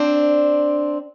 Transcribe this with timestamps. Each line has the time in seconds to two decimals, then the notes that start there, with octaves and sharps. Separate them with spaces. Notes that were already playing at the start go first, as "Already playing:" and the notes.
Already playing: C4 D4